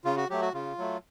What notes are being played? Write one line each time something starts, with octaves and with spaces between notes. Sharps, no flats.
C#3 F4
F#4
F#3 A3 G4
F#4
C#3 F4
F#3 A3